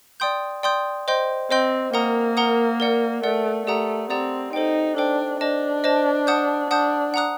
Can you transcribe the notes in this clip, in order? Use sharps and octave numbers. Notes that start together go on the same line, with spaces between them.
D5 G5 C6 D#6 G6
D5 G5 C6 D#6 G6
C5 D#5 G5 C6 G6
C4 C5 D#5 G5 C6 G6
A#3 A#4 F#5 A#5 D#6
A#4 F#5 A#5 D#6
A#4 D5 F#5
A3 A#4 D5 F#5
A3 G4 D5 F#5 A#5 D#6
C4 G4 D5 F#5 A#5 D#6
D#4 A4 C5 G5
D4 A4 C5 G5
D4 C5 D#5 A5
C5 D#5 A5
F#5 A5 D#6 G6
D4 F#5 A5 D#6 G6
F#5 A#5 D#6 F#6